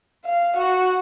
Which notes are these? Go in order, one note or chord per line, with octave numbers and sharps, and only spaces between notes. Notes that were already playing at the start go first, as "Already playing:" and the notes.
F5
F#4